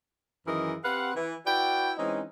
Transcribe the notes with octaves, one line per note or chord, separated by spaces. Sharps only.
F#2 D#3 E3 G#4 A#4 D#5
C4 G4 B4 F5 F#5
E3
E4 F#4 B4 D5 G5
E3 G#3 C4 C#4 D#4